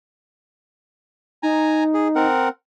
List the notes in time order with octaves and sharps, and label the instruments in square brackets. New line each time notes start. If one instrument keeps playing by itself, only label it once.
[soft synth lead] D#4 [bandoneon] G#5 A#5
[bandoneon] G#4
C4 A#4 F#5